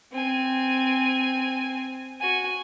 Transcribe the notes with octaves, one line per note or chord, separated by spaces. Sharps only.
C4 G#5
F#4 G#5